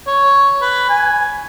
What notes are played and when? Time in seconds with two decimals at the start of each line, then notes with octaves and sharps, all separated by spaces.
0.07 C#5
0.62 B4
0.89 G#5